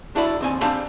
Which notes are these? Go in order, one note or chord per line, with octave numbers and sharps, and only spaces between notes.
D4 E4 F#4 A4 D5 B5
D#2 C4 G#5
C4 D4 G4 F5 A5 B5